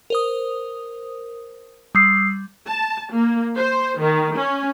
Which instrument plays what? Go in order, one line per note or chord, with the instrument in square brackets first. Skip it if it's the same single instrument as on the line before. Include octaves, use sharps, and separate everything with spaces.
[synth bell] A#4 C5 D#6
[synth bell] G3 [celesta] D#6 E6 C7
[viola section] A5
A#3
C5
D#3
C#4